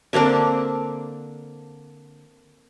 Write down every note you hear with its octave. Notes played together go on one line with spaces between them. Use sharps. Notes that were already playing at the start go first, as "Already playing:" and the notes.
D3 A#3 C4 D4